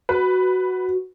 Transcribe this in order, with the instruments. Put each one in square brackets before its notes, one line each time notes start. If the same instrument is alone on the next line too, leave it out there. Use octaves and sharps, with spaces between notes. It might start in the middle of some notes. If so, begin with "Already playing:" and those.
[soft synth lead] F#4 [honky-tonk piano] B4